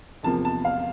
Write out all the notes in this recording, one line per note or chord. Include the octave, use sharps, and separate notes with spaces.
E2 C3 F3 A#3 A5
A5
F5